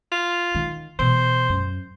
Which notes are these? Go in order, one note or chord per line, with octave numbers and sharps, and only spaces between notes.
F4
D#3
B2 E3 C5
F#2